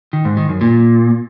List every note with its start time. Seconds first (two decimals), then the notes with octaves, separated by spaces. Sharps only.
0.13 D#3
0.25 G#2
0.37 D#3
0.49 F#2
0.61 A#2